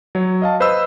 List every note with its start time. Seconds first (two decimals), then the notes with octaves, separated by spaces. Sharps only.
0.15 F#3 C#5
0.42 D#5 F5 A5
0.60 B4 C5 D#5 B5 E6